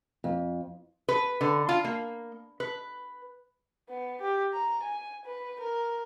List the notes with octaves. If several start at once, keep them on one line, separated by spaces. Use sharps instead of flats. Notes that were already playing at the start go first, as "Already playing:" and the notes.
F2
B4
D3
F4
A#3
B4
B3
G4
A#5
G#5
B4
A#4